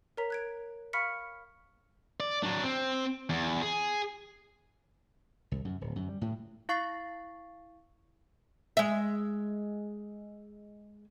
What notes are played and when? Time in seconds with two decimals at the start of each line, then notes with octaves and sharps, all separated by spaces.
0.17 A#4 C#5 A#5 B6
0.30 F#6 G#6 D7
0.93 F5 B5 C#6 F6 B6 C#7
2.20 D5
2.43 F#3 D4
2.64 C4
3.29 E2
3.62 G#4
5.51 C2
5.65 F#2
5.81 D1
5.96 F#2
6.09 G3
6.21 A2
6.69 E4 F5 C#6 A6 C7
8.77 G#3 E5